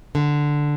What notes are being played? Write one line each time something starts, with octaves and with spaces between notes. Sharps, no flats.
D3